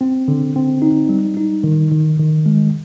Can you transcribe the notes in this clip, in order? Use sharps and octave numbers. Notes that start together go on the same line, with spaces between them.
C4
D3
C4
D#4
G3
D#4
D#3
D#3
D#3
G#3